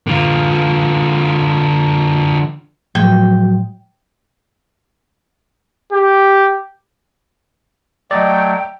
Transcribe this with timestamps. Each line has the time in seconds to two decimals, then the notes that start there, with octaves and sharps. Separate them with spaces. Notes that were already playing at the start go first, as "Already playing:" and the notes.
0.07 D3 F4
2.95 A2 F3 F#3 G#3 G5
5.93 G4
8.11 F#3 A3 D5 D#5 G5